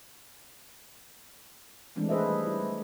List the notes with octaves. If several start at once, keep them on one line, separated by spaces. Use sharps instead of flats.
D#3 E3 G#3 A3 C4 D4
G#4 B4 C5 D#5 E5
G3
E4
A3